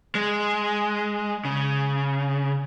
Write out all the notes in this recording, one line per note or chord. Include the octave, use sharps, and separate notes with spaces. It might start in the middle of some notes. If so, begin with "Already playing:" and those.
G#3
C#3